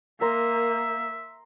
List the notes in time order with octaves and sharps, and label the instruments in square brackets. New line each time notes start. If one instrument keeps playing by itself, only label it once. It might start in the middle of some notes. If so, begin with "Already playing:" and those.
[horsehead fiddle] A#3 [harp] A#4 [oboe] E5 [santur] A#5 C6